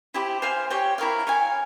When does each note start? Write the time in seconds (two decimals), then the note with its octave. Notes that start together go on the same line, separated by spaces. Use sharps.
0.14 E4 G4 C5
0.42 C5 F5 G#5 C6
0.70 G4 C#5 G5
0.98 E4 A#4 C#5 F5
1.27 C#5 F5 G#5